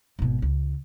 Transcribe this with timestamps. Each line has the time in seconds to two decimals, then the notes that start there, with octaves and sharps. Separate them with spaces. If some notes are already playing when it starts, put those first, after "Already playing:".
0.19 G#1 B2
0.42 C#2